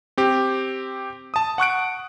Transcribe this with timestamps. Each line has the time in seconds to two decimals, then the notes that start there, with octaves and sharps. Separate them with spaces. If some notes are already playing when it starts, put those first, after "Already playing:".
0.18 C4 G4
1.34 A5 D#6
1.58 F#5 C#6 F#6 D7